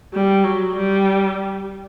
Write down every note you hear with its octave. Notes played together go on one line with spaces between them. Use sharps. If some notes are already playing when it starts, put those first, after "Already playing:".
G3
F#3
G3